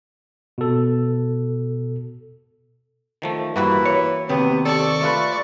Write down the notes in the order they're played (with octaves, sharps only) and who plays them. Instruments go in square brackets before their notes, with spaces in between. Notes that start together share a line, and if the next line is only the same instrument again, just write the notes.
[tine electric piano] B2 A4
[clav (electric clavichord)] D#3 F3 A3
[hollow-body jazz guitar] G2 [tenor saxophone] E3 [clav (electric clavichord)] A#3 F#4 B4
[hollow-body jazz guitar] C#5
[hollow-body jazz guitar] D#2 C3 C4 [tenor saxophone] B3
[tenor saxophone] A4 [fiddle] D5 C#6
[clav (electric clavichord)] A3 F4 B4